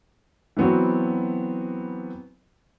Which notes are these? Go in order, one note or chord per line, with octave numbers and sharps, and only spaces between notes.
E3 F#3 B3 C4 F#4